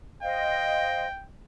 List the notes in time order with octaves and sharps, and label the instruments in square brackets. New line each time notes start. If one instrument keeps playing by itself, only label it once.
[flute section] C5 D#5 F5 [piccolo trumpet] G5